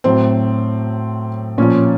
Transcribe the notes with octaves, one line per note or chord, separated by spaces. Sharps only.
A2 F#3 C4
A#2 F3 C#4